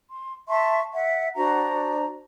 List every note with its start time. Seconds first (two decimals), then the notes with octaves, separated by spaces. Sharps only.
0.11 C6
0.48 E5 A5 C6 C#6
0.94 E5 F#5
1.36 D4 F#4 C5 A#5